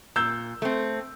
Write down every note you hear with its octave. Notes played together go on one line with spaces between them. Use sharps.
A#2 E6 G6
A3 C4